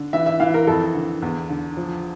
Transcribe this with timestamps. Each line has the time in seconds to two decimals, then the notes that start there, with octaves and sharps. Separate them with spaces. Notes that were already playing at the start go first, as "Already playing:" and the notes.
Already playing: D3
0.13 E3 E5
0.26 E5
0.40 E3 F5
0.54 A#4
0.67 F2 A4
0.95 D3
1.22 E2
1.49 D3
1.77 F3